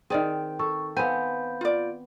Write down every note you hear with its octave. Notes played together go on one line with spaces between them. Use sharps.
D#3 C4 G#4 D5
A4 C#6
B3 C4 F5 G#5 B5 G6
F4 D5